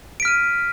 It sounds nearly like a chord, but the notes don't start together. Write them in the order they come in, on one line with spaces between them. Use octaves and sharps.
D7 B6 F6 D#7